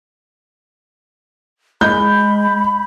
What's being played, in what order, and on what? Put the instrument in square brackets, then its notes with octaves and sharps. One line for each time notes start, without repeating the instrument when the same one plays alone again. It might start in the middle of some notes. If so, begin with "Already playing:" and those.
[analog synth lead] G#3 [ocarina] B5 [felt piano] G6